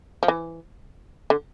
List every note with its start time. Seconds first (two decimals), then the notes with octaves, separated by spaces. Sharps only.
0.23 F3
0.28 E3
1.30 D3